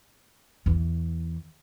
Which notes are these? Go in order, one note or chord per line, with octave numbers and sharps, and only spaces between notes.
E2 E3